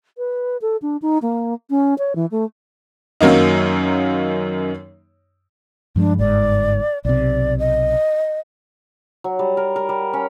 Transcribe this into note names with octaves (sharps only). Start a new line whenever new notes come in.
B4
A4
D4
D#4
A#3
C#4
C#5
E3
A3
F#2 D#3 F#3 A#3 D#4
G2 F3 G#3 D4
G1 G#2 D5
B1 C3 D5
D#5
F#3
G3
A#4
A#4
G3
C#4